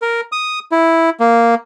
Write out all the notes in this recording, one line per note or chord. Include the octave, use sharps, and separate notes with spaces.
A#4
D#6
E4
A#3